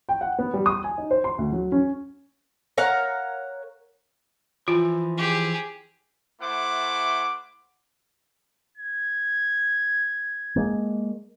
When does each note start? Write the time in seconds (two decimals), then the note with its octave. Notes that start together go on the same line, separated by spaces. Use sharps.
0.09 G5
0.21 F#5
0.39 B3
0.54 G3
0.66 D#6
0.84 G#5
0.98 D#4
1.11 C5
1.24 C6
1.38 D2
1.52 F#3
1.72 C#4
2.78 A#4 C#5 F5 F#5
4.68 E3 F3 F4
5.17 G4 G#4
6.40 A3 E4 C5 F#5 D6
8.77 G#6
10.56 G#3 A#3